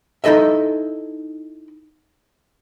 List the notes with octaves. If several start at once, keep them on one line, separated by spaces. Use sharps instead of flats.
D#4 E4 A4 D#5 E5